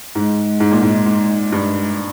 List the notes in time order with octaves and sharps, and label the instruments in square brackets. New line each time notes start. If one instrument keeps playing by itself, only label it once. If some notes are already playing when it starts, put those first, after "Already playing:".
[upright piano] G#2 [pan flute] G#3
[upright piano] G#2
A#2
G#2
G#2
G2